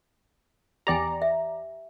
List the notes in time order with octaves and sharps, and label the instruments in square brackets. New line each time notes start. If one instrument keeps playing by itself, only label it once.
[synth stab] E2 D5 A#5 [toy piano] G4 G5 G#5
[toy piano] E5